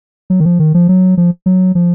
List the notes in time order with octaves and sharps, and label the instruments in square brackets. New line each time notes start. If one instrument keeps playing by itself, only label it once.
[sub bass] F#3
D#3
F3
D#3
F3
F#3
F3
F#3
F3